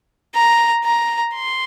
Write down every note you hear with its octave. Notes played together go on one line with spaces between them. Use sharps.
A#5
A#5
C6